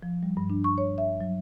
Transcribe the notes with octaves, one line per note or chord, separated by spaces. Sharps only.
F3
G3
G2
D4
C#6
C#5
E5
F#3